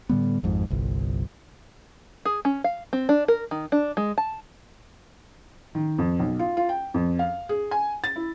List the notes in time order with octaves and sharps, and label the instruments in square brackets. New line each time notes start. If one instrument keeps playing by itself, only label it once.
[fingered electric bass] A2 D3 G3 B3
G#1 F2 G#2
G1 C2
[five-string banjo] G#4
C#4
F5
C4
D4
A#4
D#3
D4
G#3
A5
[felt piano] D#3
F2
B1
F4
F4
G5
F2
F5
G#4
G#5
A6
E4